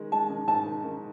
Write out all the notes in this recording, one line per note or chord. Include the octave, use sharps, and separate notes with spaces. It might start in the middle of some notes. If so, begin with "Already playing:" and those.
Already playing: D#3 G#3
G#3 A5
D#3
G#2 A5
D#3
D#3